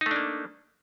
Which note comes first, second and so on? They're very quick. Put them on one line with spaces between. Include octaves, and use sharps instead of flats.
D#4 A3 D4 A#3